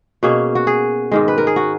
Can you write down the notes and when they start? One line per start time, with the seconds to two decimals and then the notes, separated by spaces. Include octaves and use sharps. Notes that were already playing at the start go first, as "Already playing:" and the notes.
0.23 B2 A#3 C#4 G#4
0.55 F#4
0.67 G#4
1.11 G#2 D#3 G#3
1.28 B4
1.38 A#4
1.47 G#4
1.56 F#4